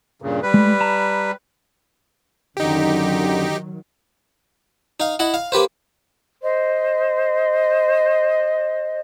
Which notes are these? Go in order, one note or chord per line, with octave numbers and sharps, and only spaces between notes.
G2 A#2 C#3
G3 B4
G#3 A3
A5 A#5
F#2 D3 D#3 F#3 D#4 G4
D#4 F5
E4 D#5 F#5
F5
A#3 G4 B4 C5
C5 D#5